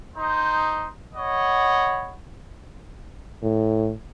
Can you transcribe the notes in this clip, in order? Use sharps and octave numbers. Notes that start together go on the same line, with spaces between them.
D#4 C5
C#5 D#5 F#5 B5
A2